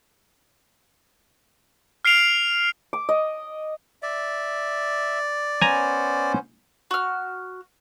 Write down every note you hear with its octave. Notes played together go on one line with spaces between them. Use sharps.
F6 C7 D7 F7
D6
D#5
D5 E5
B3 C#4 C5 G#5 A#5
F#4 F6